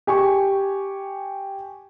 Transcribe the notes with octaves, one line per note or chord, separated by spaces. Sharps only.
G4 G#5 C#6